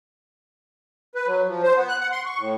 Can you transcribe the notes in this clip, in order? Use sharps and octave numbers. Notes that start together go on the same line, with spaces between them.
B4
F#3
F3
C5
B3
F#6
F#5
C6
C#6
A2